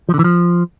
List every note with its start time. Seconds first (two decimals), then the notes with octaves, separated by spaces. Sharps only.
0.09 F3
0.14 D3
0.19 E3
0.24 F3